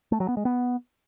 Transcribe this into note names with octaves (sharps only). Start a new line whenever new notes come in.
A3
F#3
B3
G#3
B3